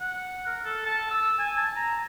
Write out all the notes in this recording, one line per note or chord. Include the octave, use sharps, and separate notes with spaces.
F#5
A#4
A4
A5
E6
G#5
A5
A#5